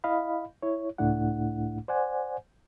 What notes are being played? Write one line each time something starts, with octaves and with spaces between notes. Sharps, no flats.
E4 D#5 F5 B5
E4 C#5
C#2 A2 A3 D4 E4 F#5
C5 D5 F#5 G#5